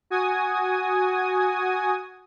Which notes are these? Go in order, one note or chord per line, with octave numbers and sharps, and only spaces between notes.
F#4 G#5 D#6